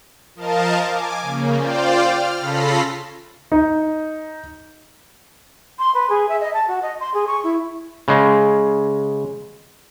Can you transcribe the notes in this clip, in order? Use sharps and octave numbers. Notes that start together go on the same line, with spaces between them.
F3 A#4 D#5 F5 A5
G#5 D6
C#3 A#3
F4 C5 D5 F5 G5
F6
C#3 F4 A4 B5 A#6 C7
D#4
C6
B4
G#4
E5
D#5
A5
F#4
D#5
C6
G#4
C#6
E4
C#3 G#3